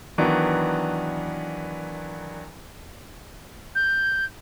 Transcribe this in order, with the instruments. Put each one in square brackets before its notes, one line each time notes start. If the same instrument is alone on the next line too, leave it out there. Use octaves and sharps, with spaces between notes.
[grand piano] D#3 E3 F#3 B3 D4
[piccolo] G6